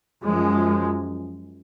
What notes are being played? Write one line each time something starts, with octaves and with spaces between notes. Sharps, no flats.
F#2 F3 G#3